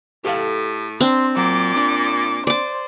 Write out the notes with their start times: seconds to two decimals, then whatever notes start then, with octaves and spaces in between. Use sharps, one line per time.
0.25 A2 G4 A4 F5
1.00 C4 D4 C6
1.37 A#2 F#3 D6
1.76 D4
2.47 C5 D5 D6